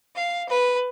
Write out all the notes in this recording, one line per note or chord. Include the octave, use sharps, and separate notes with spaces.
F5
B4